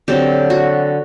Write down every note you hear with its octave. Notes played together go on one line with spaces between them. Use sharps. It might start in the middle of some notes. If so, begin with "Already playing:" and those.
D3 F#3 C4 G4
F#4